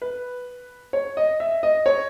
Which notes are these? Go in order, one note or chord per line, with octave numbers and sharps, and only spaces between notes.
B4
C#5
D#5
E5
D#5
C#5